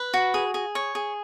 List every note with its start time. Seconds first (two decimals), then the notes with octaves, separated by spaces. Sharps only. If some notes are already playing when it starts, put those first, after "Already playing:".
Already playing: B4
0.14 F#4
0.34 G#4
0.54 G#4
0.75 C#5
0.95 G#4